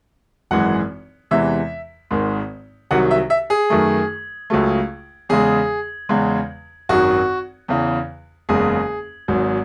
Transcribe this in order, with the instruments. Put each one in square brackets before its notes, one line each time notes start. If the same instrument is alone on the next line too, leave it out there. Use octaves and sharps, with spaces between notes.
[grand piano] G#1 F#2 E3 G#3 F#5
E2 C3 E3 G#3 E5
G#1 G#2 D#3 G#3
C2 C3 D#3 F#3 F#5
E5
E5
G#4
F#2 D#3 A3
C#2 C#3 F#3 A3
E2 C#3 G#3 G#4
E2 C#3 G#3
G#1 F#2 D#3 F#3 F#4
E2 C#3 E3
F#1 E2 C#3 G#3 G#4
G#1 G#2 F#3